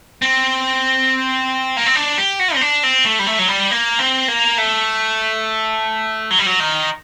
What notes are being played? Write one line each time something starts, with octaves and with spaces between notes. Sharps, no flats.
C4
A#3
C4
D4
G4
F#4
C4
D4
C4
A3
G3
A3
F#3
G3
A#3
C4
A#3
A3
F#3
G3
F#3
D#3